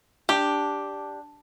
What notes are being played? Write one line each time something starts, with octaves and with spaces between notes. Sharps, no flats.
D4 G4